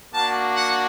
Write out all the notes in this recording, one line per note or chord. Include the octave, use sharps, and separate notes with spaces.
A#3 D4 F#4 A5
F#5